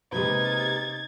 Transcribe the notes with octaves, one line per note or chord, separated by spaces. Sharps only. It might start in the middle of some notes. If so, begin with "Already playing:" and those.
C3 G#3 A#3 D#4 G4 B4 G#6 A6